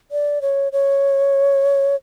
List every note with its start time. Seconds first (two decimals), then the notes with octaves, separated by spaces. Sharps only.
0.12 D5
0.42 C#5
0.72 C#5